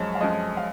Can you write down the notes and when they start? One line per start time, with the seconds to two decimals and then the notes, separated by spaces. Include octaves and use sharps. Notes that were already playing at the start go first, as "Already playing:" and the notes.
Already playing: F#2 F3 G#3 C#5
0.15 F5
0.21 F#2 F3 G#3 D#5
0.57 F5